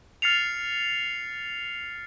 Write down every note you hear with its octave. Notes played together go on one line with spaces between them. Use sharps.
F6 A6 C7 C#7 F7